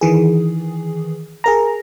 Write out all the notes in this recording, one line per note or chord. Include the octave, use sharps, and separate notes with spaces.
D#3 E3 G#4
G#4 A#4 A#5